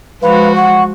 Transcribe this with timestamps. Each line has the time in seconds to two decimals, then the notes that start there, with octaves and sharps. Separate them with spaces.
0.22 F3 G#3 F#4 B4 F5
0.56 F#5 C#6